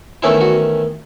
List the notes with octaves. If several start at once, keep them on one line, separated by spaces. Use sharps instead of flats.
E2 D#3 A3 C#4 E4
F#4